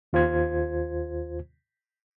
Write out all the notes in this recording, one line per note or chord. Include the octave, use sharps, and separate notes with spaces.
D#2 F4 C5 G#6